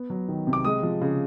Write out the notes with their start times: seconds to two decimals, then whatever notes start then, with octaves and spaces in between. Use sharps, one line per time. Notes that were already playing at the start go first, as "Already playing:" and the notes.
Already playing: B3
0.10 F#3
0.28 D#3
0.47 C3
0.53 D6
0.65 G#3 D#6
0.83 F3
1.01 C#3